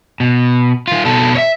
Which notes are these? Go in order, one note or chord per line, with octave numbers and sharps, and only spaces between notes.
B2
D#3 F4
B2 A4
C#5 E5